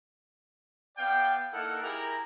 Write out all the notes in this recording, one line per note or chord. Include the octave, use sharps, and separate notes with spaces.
B3 D5 F5 G5
A#3 D#4 E4 A4 A#4 F#5
E4 G4 G#4 A#4 A#5